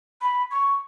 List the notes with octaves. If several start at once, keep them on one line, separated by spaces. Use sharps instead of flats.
B5
C#6